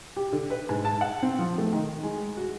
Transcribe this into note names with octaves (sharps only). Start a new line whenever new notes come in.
G4
D3
B4
G#2
A5
F#5
C4
F3
A3
D#3
G#3
F#4